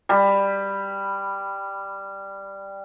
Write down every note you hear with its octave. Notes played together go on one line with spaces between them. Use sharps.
G3 B5